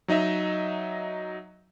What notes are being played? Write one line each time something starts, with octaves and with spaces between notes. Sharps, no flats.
F#3 D#4 D#5 E5